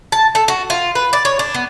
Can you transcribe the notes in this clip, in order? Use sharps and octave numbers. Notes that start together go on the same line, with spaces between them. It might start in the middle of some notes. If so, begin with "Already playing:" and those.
A5
A4
F#4
F4
B4
D5
C#5
D4
B3